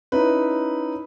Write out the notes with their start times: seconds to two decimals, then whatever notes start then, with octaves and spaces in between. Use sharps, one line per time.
0.12 C#4 D#4 E4 B4